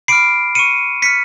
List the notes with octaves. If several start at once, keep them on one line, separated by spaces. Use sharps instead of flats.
B5 D6 F6 C7 D7
C#6 F6 C#7 D#7
C#6 F6 B6 C#7